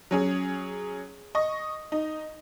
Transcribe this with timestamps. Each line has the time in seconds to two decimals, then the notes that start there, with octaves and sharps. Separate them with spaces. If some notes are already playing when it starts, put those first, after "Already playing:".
0.11 F#3 C#4 G#4
1.35 D#5 C#6
1.92 D#4